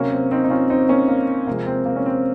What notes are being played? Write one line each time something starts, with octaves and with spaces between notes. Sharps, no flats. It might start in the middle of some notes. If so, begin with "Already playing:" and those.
Already playing: C3 F#3 A#3 C#4
C4
C4 D#4
D#4
C#4 F4
C4 D#4
A#3 C#4
A#3
C3 F3 G#3 A#3
C4
A#3
C#4
C4